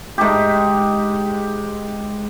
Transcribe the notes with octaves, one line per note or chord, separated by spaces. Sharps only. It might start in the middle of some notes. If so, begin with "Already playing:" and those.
G#2 G4